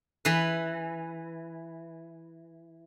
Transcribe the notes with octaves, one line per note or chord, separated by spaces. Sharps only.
E3 B4